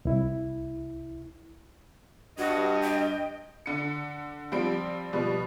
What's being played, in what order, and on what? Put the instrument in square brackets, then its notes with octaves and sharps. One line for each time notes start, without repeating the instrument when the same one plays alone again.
[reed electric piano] C2 E4
[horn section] G2 [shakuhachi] F#4 [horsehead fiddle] D#5
[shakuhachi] G5
[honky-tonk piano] D3 C#7
F3 G3 C4 D7
B2 F3 G3